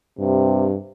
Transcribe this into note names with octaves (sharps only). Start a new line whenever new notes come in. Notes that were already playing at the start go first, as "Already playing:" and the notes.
G2 C3